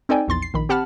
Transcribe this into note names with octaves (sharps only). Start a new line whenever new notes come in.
C4 D#4 A4 D5 G5 G#5
A#1 E2 C6 A6
C7
A#1 D#3 B5
C4 G4 F#5 A5 B5 F6